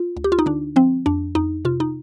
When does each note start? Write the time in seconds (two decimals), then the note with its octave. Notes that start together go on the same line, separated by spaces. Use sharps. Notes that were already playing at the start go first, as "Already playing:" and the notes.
Already playing: F4
0.17 D2
0.24 G4
0.32 F4
0.39 D#4
0.46 D3 D4
0.76 F3 C4
1.06 F2 D4
1.35 F2 D#4
1.65 C3 F4
1.80 D#4